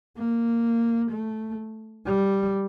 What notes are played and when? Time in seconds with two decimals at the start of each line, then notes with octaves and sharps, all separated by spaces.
0.17 A#3
1.11 A3
2.06 G3